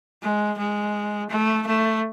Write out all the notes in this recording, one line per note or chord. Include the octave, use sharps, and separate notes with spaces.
G#3
G#3
A3
A3